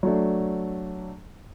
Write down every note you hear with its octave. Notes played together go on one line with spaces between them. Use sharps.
F#3 A3 D4